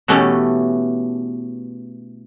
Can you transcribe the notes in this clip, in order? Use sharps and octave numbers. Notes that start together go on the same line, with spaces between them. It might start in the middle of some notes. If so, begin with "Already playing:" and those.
B2 E3 A3 C#4 G4 A4